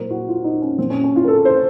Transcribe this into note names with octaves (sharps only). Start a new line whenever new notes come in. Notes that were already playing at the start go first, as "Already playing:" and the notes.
Already playing: A#2 F#3 A#4 C5
F#4
F4
D#4
C#4
A#2 F#3 C4
C#4
C#4
F4
A#4
A4
C5